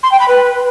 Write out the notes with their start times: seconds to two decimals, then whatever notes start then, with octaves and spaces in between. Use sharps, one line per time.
0.03 C6
0.11 G5
0.20 B5
0.28 B4